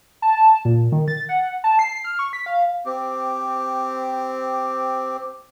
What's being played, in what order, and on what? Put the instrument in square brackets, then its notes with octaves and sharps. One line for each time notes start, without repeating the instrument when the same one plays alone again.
[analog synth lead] A5
A#2
D#3
A6
F#5
A5
C7
F6
C#6
B6
F5
[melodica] C4 G4